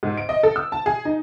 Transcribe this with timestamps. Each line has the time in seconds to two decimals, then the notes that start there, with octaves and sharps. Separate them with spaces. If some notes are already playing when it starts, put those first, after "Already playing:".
0.03 G#2
0.17 D7
0.29 D#5
0.43 A4
0.56 E6
0.72 A5
0.86 G#4
1.05 D#4